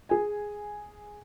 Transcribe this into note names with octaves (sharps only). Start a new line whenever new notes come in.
G#4 G#5